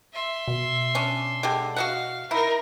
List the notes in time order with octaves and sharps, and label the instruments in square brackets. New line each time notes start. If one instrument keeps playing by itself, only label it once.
[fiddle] E5 C6
[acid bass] B2
[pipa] C#4 D4
D3 G#3 G4
[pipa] F#4 D#5 F#5 [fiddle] F5
[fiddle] D#4 A#4 [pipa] E4